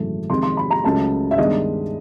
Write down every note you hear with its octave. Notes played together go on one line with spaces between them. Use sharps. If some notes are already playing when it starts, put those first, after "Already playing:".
Already playing: G#1 F#2 C#3 E3 A3
F2 C3 D#3 G#3 C6
C6
B5
A#5
C#2 C#3 F#3 A3 A5
E5
G2 D#3 G#3 B3 D4 D#5